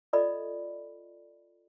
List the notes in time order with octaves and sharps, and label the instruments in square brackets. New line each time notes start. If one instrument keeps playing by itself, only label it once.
[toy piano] F4 A4 D5 D#5 B5